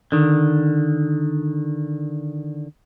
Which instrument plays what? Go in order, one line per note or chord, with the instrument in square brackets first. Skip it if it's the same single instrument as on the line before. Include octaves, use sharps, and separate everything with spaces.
[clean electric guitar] D3 D#3